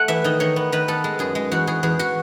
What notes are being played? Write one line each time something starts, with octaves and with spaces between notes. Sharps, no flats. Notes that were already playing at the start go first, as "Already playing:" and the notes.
Already playing: A3 F#5
E3 E5
D#3 D#5
D#3 C#5
B3
D#3 B4
B3 A4
G#3
F#2 G#4
G#3
E2 F#4
E2 G#4
E2 G#4
F#4